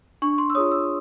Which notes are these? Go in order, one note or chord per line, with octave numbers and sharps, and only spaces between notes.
D4 C#6
C6
E6
F4 G#4 C#5 D#6
E6